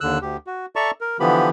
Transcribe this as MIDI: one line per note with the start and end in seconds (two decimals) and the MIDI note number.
0.01 0.19 39
0.01 0.19 50
0.01 0.19 88
0.01 0.19 90
0.22 0.37 38
0.22 0.37 67
0.47 0.66 66
0.76 0.91 69
0.76 0.91 74
0.76 0.91 76
0.76 0.91 81
0.76 0.91 82
0.76 0.91 85
1.01 1.17 70
1.20 1.50 50
1.20 1.50 52
1.20 1.50 53
1.20 1.50 59
1.20 1.50 67
1.20 1.50 83